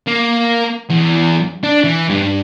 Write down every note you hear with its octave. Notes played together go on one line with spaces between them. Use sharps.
A#3
E2
D4
E3
G2